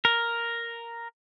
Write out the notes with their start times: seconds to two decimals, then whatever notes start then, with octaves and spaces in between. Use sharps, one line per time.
0.05 A#4